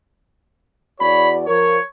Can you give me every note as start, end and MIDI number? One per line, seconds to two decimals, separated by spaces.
0.99 1.44 40
0.99 1.44 66
0.99 1.28 73
0.99 1.44 74
0.99 1.28 83
1.47 1.77 53
1.47 1.77 70
1.47 1.80 73